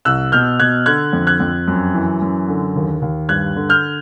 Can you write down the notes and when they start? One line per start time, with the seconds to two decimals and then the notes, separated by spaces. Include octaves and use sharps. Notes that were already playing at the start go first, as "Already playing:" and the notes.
0.05 C2 E6 F#6
0.32 B2 F6 G6
0.60 B2 F#6 G#6
0.86 D3 F#6 G#6
1.13 F2
1.27 F#6 G#6
1.40 F2
1.68 F#2
1.94 E3
2.22 F#2
2.48 D3
2.76 D#2
3.02 D#2
3.29 G2 F#6 G#6
3.56 D3
3.69 F6 G6